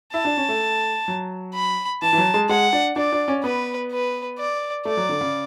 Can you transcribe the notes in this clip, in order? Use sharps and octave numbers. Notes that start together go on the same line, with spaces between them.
E4 A5
D4
C#4
A3
F#3
B5
E3 A5
E3
F#3
G#3
G#3 F#5
D4
D4 D5
D4
C#4
B3 B4
B4
D5
A3 D5
F#3
D3
C#3